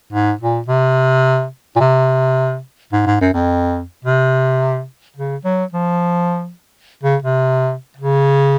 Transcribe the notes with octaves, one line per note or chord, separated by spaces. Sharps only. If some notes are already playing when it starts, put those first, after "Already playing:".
G#2
A#2
C3
A#2
C3
G#2
G#2
F#2
F2
C3
C#3
F#3
F3
C#3
C3
C#3